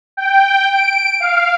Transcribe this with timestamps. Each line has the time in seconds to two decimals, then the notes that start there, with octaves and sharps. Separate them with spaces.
0.17 G5
0.73 D7
1.20 F5